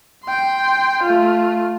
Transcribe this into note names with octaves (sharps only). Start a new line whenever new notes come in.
G5 C6
A3 F4